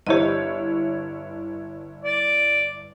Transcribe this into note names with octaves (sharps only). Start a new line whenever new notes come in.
G1 E4 G4 C#5 D#5
D5